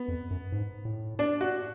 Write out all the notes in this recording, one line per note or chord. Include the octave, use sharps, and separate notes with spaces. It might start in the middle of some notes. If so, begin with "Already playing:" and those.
Already playing: B3
F2
F#2
G#2
A2
D4
F#4